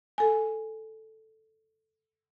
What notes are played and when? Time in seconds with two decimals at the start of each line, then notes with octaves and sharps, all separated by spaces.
0.18 A4 G#5